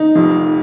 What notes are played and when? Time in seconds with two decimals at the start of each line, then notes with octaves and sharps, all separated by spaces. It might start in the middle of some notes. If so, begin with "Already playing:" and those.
Already playing: D#4
0.15 F1 F2 F3